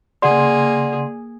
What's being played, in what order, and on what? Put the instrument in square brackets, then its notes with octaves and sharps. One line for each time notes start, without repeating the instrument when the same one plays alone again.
[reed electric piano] C#3 C6 [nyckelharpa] A#3 G#4 [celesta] D5 F#5